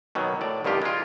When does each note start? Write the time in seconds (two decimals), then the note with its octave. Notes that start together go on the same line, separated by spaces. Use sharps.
0.15 B2 D#3 F#3
0.41 A2 D5
0.64 C2 G2 D#3 F4 G4
0.82 G#3 F4